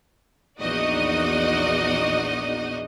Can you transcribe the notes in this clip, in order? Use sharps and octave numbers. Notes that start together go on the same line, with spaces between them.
A#1 E2 D#4 F#4 D5 D#5